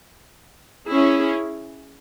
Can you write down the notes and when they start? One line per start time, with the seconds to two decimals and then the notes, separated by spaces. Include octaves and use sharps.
0.90 C#4 E4 G#4